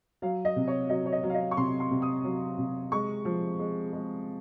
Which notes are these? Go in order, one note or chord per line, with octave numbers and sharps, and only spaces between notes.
F#3 F5
D#5
C3
C#5
F#3 D#5
C#5
D#5
F#3
F5
D#5
C#6
C3 C6
C6
C3
D#6
F#3
C3
G#3 C#6
F3
G#3
G#3